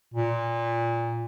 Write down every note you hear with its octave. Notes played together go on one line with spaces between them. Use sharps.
A#2